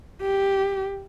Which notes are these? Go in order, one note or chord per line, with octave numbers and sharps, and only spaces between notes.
G4